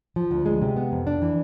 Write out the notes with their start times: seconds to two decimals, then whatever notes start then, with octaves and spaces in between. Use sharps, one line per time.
0.16 F3
0.31 D2
0.46 G#3
0.62 C3
0.76 B3
0.92 F2
1.07 D4
1.22 E3